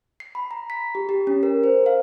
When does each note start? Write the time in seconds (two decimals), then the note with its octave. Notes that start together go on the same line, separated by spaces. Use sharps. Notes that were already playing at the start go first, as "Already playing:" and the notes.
0.20 C7
0.35 B5
0.51 A#5
0.70 B6
0.95 G4
1.09 G4
1.27 C#4
1.43 A#4
1.64 C5
1.86 F5